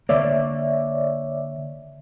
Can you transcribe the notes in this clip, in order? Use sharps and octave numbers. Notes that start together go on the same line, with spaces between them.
D3 A#3 C#5 D5 E5